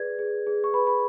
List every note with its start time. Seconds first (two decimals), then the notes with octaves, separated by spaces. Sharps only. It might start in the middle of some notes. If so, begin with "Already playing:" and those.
Already playing: G#4 B4 D5 G#6
0.19 G#4
0.47 G#4
0.64 C#6
0.73 B4 B5
0.87 B5